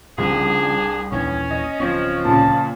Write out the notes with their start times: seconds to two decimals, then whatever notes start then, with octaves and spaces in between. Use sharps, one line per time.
0.18 C2 C#3 F3 D4 G#4
1.12 A#1 D#2 E3 C#4 C#5
1.51 D#5
1.80 D1 F3 C4 C#4 C#5
2.25 A#2 C#3 A5